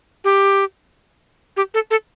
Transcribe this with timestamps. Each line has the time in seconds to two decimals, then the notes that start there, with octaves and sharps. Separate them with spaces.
0.24 G4
1.57 G4
1.74 A4
1.91 A4